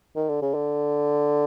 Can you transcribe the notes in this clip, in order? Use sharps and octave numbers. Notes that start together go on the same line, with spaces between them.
D#3
D3
C#3
D3